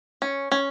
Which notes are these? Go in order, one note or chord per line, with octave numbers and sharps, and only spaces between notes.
C#4
C#4